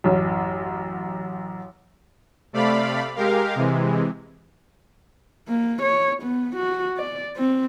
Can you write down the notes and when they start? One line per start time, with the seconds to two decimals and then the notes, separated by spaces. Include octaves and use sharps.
0.04 A1 F#2
2.53 C3 A3 D5 F5 B5
3.16 G#3 G4 A#4 F5
3.56 C3 E3 G#3
5.48 A#3
5.82 C#5
6.22 B3
6.56 F#4
6.97 D5
7.37 C4